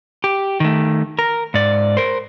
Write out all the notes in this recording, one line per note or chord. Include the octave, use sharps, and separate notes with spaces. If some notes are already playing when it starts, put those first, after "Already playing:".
G4
D#3 A3
A#4
G#2 D5
A#4 C5